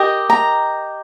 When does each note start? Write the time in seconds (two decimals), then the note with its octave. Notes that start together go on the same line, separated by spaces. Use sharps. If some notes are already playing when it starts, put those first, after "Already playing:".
Already playing: G4 A#4 D#5
0.30 A#5